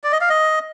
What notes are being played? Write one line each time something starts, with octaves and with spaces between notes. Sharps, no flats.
D5
D#5
F5
D#5